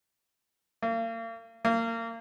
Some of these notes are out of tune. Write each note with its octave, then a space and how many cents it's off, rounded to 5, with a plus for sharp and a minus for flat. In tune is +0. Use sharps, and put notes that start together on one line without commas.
A#3 -35
A#3 -25